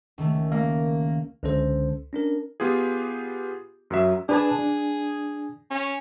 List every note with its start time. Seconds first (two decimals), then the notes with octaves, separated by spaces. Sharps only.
0.18 C#2 D#3 A3
0.52 A#3
1.43 C#2 D3 C#4 A4 C5
2.13 C#4 D4 A#4
2.60 B3 F4 G4 G#4
3.90 F#2 F#3 E5
4.29 D4 G#4 B4 A5
4.59 D4
5.70 C#4